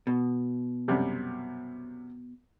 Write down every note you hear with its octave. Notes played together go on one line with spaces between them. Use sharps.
B2
F#2 C3 G3